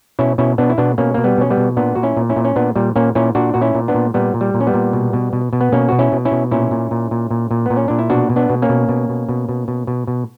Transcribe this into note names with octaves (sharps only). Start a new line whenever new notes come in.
B2 C#4 E4
B2 C#4 E4
B2 B3 D4
E4
B2 B3 D4
B2 A#3 C#4
B2 A#3
G3 B3
B2 C#4
G3 B3
B2
A#2 B3 D4
A#2 F#4
C#4 E4
A#2
C#4 E4
A#2
C#4
A#2 B3 D4
A#2 G3
A#2 A#3 C#4
A#2 C#4 E4
A#2 D4 F#4
A#2 F#4
C#4 E4
A#2
B3 D4
A#2
A#2 G3 B3
A#2
G3
A#2
C#4
G3 B3
A#2
B2
B2
B2
B2
B3
B2 A#3 C#4
B2 F#4
C#4 E4
B2
C#4 E4
B2
A#2 C#4 E4
A#2
A#2
A#2
A#2
A#2
A#2 B3
C#4
A#2 D4
E4
B2 D4 F#4
B2
B3 D4
B2
A#3 C#4
B2
B2
B2
B2
B2
B2
B2
B2